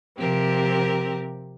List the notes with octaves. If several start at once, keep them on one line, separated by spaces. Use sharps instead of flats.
C3 F3 C4 G4 A#4